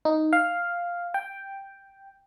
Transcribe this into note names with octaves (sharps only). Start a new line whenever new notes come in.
D#4
F5
G5